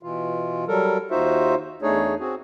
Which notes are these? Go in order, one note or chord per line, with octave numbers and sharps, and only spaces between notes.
B2 E3 F4
F#3 G3 A4 A#4
D#2 D#4 F4 F#4 C5 E5
E2 A3 D4 D#4 G#4 C#5
C4 F#4 G#4